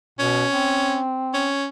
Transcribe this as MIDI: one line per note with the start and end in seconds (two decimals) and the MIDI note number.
0.19 0.45 47
0.19 1.00 61
0.51 1.50 60
1.34 1.66 61